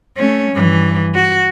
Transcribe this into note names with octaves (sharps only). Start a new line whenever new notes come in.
A3 C#4
G2 E3
F#4